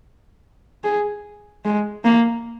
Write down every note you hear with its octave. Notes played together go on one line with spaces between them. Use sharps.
G#4
G#3
A#3